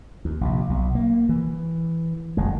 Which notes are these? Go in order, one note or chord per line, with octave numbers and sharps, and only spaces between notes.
D#2
A#1 C3
B1
A#3
E3
F#1 G#3